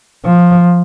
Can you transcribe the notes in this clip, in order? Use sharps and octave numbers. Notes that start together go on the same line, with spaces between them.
F3